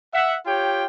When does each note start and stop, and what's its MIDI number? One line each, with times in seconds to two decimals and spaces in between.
0.13 0.36 76
0.13 0.36 78
0.46 0.86 65
0.46 0.86 67
0.46 0.86 73
0.46 0.86 79